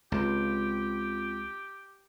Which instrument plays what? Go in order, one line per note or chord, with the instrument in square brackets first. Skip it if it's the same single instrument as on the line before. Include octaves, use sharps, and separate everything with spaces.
[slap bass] C#2 [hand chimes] C4 F4 C6 [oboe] G4